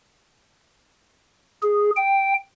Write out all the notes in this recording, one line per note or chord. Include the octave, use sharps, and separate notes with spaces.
G#4
G5